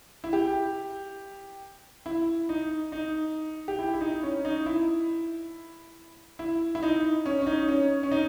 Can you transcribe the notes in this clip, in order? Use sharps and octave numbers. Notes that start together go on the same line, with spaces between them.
E4
G4
E4
D#4
D#4
G4
E4
E4
D#4
C#4
D#4
E4
E4
E4
D#4
C#4
C#4
D#4
C#4
C#4
D#4